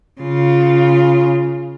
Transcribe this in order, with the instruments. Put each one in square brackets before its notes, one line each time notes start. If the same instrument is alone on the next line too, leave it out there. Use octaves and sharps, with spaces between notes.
[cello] C#3 F4